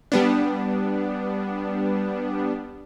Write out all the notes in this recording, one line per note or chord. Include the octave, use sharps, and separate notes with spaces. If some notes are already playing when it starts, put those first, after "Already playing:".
G3 B3 D4